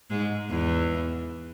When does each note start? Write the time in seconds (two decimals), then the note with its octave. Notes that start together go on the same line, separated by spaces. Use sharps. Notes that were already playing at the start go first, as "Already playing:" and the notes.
0.10 G#2 G#3
0.49 E2 E3